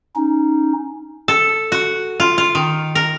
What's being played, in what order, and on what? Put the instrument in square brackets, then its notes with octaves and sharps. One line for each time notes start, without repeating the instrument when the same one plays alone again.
[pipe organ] C#4 D#4
[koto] A4
F#4
F4
F4
D#3
A#4